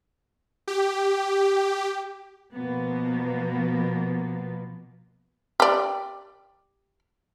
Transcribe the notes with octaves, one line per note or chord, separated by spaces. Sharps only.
G4
B2 F3 A#3 B3
G4 D5